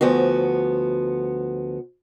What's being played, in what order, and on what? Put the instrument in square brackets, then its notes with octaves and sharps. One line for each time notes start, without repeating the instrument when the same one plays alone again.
[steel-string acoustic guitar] D2 F3 B3 F#4